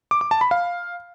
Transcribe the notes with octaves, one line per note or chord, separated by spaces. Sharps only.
D6
D6
A5
B5
F5